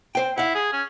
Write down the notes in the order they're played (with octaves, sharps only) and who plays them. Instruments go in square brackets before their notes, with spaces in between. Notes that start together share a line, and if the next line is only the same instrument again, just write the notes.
[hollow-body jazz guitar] C5 G5
[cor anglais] E4 [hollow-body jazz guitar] F5 F#5
[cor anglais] G#4
C#4